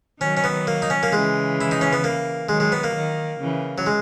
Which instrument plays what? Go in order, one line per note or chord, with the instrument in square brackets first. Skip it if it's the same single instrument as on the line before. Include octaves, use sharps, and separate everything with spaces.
[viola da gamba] D#3 F#3 [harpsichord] C#4
[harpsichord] C#4
B3
A#3
D#4
C#4
A#3
[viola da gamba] C#3 E3 [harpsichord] G#3
[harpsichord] E4
D#4
C#4
B3
A#3
[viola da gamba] D#3 F#3 [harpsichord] G#3
[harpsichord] G#3
B3
A#3
[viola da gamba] D#3
C#3 E3
[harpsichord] F#3
G#3